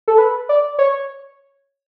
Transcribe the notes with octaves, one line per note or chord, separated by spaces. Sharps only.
A4
B4
D5
C#5